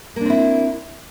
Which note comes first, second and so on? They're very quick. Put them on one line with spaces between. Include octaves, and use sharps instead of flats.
A#3 D4 C4 E4